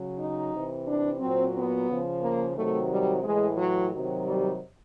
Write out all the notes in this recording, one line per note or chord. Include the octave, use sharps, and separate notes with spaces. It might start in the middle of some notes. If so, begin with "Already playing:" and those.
Already playing: C#3 F#3
D#4
C3 E3
D4
A#2 F#3 C4
B3
C#3 F3
A#3
C3 D#3 F#3 A3
G3
A2 E3 G#3
F#3
C3 D#3 F#3
G3